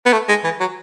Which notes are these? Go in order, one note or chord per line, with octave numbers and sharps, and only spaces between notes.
B3
A3
G#3
E3
F#3